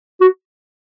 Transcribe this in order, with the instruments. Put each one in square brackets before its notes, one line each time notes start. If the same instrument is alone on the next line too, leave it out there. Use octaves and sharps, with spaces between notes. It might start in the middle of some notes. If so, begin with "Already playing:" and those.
[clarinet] F#4